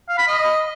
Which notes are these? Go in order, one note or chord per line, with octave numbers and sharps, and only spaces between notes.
F5
B5
D#5